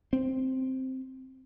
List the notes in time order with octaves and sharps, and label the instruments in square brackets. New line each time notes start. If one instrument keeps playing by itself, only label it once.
[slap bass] C4